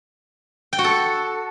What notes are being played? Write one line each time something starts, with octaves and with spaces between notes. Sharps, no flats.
G5
F#4
A4